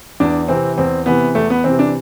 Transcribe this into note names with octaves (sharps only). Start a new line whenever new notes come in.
E2 D4
C3 E3 C4
E2 C4
C3 E3 B3
E2 A3
B3
C3 E3 C4
D4